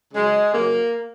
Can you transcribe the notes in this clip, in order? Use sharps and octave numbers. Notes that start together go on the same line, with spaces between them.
C#3 F#3 G#3
C#3 F#3 A#3